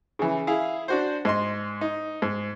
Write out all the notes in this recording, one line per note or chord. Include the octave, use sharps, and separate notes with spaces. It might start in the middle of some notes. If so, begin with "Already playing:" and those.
C#3 E3
E4 G#4 F5
D4 F#4 C5
G#2 D#5 C6
D#4
G#2